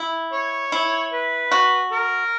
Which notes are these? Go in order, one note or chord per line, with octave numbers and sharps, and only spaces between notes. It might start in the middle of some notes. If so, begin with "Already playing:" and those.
Already playing: E4
C#5
E4
B4
F#4
A#4